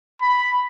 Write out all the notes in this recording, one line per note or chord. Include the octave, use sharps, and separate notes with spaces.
B5